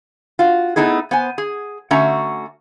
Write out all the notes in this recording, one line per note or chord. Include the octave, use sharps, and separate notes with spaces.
F4 F#4
A3 B3 D#4 E4 G#4
B3 C5 G#5
G#4
D3 A3 C#4 F#4 E5 A#5